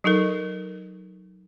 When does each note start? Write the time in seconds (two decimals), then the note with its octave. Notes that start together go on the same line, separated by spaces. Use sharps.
0.04 F#3 D#4 A4 A#4